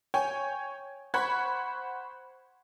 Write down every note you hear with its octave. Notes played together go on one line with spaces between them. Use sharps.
C#5 G5 G#5
C5 F#5 B5 C#6 G#6